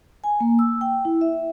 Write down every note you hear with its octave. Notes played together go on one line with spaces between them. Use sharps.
G#5
A#3
E6
G5
E4
E5